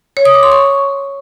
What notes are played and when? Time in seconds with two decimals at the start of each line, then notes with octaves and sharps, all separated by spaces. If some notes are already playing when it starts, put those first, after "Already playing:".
0.17 C#5
0.25 D#6
0.34 D6
0.43 C6
0.52 C#6